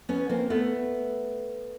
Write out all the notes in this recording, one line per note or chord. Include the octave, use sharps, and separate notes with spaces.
B3 C#4
A#3 C4
A3 B3